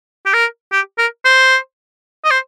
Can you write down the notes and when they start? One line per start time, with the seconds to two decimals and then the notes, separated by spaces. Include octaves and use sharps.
0.26 G4
0.33 A#4
0.72 G4
0.98 A#4
1.25 C5
2.24 D#5
2.31 C5